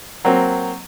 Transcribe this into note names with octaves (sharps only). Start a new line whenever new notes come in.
F#3 A#3 C4